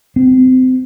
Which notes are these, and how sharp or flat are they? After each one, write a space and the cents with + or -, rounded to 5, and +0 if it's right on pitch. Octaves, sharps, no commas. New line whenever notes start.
C4 -30